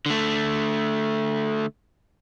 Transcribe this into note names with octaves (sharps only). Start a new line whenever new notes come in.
D3 A3